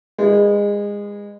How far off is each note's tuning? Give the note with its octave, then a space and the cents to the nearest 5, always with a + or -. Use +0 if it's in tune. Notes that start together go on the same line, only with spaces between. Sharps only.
G#3 -25 E4 +0 B4 +0